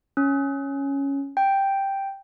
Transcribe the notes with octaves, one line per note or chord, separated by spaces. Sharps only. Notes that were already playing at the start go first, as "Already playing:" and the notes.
C#4
G5